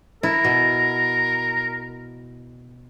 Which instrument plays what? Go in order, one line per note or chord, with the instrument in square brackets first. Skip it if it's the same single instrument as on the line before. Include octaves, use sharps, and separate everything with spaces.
[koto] E4 [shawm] A#4
[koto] B2